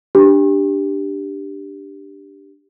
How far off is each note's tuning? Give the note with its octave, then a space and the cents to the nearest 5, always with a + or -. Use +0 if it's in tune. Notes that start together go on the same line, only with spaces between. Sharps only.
D4 +0 G4 +0